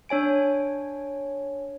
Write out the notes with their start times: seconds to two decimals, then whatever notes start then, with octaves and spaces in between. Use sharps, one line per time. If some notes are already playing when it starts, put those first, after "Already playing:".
0.09 D4 C#5 G#5 D7